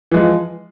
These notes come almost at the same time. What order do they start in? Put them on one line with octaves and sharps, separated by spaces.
E3 G#3 F3